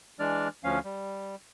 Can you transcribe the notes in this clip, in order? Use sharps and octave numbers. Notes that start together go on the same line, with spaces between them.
E3 G#3 D4 D5 F6
D2 F3 C#4 F5
G3